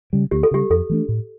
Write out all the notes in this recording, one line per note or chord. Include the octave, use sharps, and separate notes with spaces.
C#3 G3
D2 G4
A4
C#3 G3 G4
F2 A4
E3 A3 D4
A2